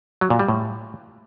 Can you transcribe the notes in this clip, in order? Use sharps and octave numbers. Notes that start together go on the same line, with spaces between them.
F#3
A#2
G3
A2